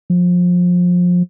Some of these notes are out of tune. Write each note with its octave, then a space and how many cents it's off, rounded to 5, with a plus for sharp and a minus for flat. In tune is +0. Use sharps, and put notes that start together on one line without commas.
F3 +25